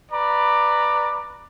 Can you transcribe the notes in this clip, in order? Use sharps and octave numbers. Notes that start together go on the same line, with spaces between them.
B4 D5 A#5 B5